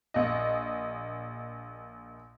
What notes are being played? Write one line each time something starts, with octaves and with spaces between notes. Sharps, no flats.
A#1 D#5